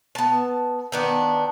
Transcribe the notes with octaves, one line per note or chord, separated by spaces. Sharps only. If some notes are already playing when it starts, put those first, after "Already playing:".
B3 A5
D#3 B3 D4